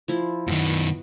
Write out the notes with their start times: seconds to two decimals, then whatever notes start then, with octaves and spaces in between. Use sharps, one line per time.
0.08 F3 E4
0.48 F#2 D#3 B3